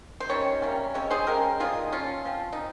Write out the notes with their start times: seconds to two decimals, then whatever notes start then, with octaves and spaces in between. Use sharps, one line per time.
0.20 C5
0.29 D#3 G3 C#4 C#5
0.62 C3 G3 A#3 C#4
0.94 C#3 G#3 C4 C#5
1.10 G#4 C5
1.27 C#3 G#3 C#4 G4 A#4
1.60 D#3 G3 A#3 F4 G#4
1.92 F3 C4 C#4 F4
2.25 F3 C4
2.53 D#4